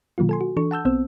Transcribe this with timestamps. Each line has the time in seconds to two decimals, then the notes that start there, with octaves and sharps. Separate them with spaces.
0.18 B2 D#3 F#3 A#3 F4
0.29 A4 G#5 C6
0.41 F#4
0.57 E3 D4 A4 C#6
0.71 F#5 A5 E6 G6
0.85 B1 B3 C4 C5 E6